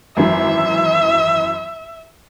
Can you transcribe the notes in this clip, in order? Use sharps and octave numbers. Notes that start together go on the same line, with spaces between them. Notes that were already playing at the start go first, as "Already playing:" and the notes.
G#1 F#2 E3 E5